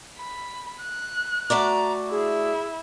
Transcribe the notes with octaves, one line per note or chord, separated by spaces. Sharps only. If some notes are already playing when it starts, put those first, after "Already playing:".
B5
F#6
A3 F#4 D5 A#5
E4 G#4